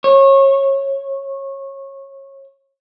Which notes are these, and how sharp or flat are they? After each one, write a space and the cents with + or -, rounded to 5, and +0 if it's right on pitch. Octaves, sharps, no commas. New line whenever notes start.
C#5 -25